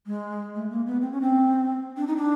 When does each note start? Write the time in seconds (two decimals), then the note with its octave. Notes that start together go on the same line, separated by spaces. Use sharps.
0.06 G#3
0.55 A3
0.71 A#3
0.87 B3
1.01 C4
1.12 C#4
1.21 C4
1.97 D4
2.07 D#4
2.17 D4